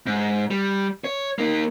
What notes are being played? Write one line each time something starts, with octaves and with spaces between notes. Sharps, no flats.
G#2
G3
C#5
A#3 D#4